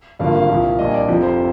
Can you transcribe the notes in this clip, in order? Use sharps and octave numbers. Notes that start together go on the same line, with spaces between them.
G#1 G2 D3 F3 A#3 F5
F5
C2 A#2 F3
A#1 A#2 G3 D4 D#5
D5
F1 F2 C3 F3
C5